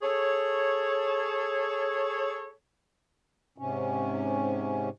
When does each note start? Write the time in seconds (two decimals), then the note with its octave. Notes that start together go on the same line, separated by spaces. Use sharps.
0.02 G#4 A4 C#5
3.58 G#2 C3 C#4